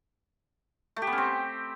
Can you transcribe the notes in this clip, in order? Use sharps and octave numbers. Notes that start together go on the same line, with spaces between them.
A3
G4
B3
C#4
C4